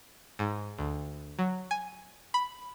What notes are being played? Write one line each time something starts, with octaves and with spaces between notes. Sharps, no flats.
G#2
D2
F#3
G#5
B5